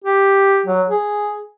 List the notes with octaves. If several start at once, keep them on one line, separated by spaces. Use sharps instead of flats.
G4
F#3
G#4